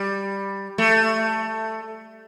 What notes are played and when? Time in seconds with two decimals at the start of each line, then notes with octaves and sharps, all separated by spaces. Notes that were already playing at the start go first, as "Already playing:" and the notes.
Already playing: G3
0.78 A3